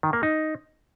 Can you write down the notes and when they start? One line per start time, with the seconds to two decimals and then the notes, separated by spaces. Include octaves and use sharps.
0.03 D#3
0.13 A#3
0.23 D#4